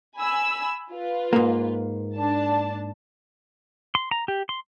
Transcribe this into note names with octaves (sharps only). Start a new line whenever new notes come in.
G#5 B5 E6
F4 B4
G#2 A#3
D4 A5
C6
A#5
G4
C6